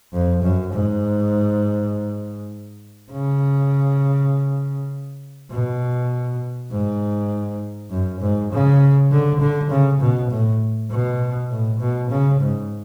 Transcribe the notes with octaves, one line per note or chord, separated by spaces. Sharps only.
F2
F#2
G#2
C#3
B2
G#2
F#2
G#2
C#3
D3
D3
C#3
B2
A2
B2
A2
B2
C#3
G#2